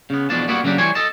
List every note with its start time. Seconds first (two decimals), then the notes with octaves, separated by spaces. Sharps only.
0.10 C#3 B3
0.30 E2 B2 F3 D4 A5
0.48 G3 A#3 B3 E4 F#4
0.64 C#3 F#3 A#3 D4 G4
0.78 E3 G3 C5 C#5 G#5
0.95 A4 D#5 A5